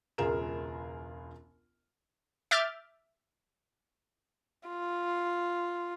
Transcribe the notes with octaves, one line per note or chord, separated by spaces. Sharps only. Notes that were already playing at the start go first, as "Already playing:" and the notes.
E1 C#2 F4 G#4 A#4 E7
E5 D6 F6 G6 A6
F4